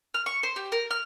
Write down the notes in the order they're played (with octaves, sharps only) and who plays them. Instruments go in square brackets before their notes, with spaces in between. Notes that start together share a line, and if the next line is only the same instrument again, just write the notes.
[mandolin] F6
C#6
C5
G4
A#4
F6